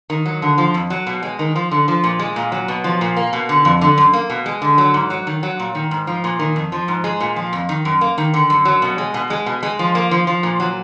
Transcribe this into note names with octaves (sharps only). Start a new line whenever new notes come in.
D#3
F#3
D3
F3
F2
F#3
B2
G#3
D#3
F3
D3
F3
A#2
G#3
A#2
F#3
B2
F3
A#2
A#3
B2
D3
F2
D3
F#2
A#3
B2
G#3
D3
F#3
G#2
F#3
D#3
F#3
A#2
D#3
G#2
F3
A#2
D#3
F2
F3
G#2
G#3
A#2
F3
F2
D#3
F#2
A#3
D#3
D3
F#2
F#3
B2
G#3
B2
G#3
B2
G#3
F3
A#3
F3
F3
A#2
F#3